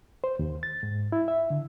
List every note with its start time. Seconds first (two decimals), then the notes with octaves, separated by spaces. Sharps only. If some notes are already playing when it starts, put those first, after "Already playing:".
0.24 C5
0.39 D#2
0.63 A6
0.83 G#2
1.12 E4
1.28 E5
1.50 D3